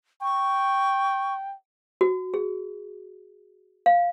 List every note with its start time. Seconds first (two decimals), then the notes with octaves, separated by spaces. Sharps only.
0.22 G5 C#6
2.01 F#4
2.34 G#4
3.86 F5